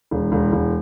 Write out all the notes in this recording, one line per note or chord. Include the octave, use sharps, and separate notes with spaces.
E1
E1
E1